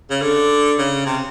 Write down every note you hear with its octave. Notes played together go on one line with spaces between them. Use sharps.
C#3
D3
C#3
C3